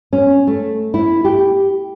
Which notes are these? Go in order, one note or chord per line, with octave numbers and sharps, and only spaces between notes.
C#4
A3
E4
G4